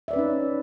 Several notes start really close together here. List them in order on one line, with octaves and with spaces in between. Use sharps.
E5 D5 B4 C#4 D#4